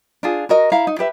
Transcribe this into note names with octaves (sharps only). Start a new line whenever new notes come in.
D4 F4 G#4
F#4 A#4 D#5
E4 F5 A#5
D#4
G4 B4 E5